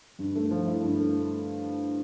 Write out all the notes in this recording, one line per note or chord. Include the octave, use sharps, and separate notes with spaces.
G2
A3
F3
E4
G2
A3